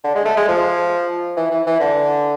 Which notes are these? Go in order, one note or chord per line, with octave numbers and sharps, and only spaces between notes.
D3
G#3
A3
G#3
F3
E3
E3
E3
D3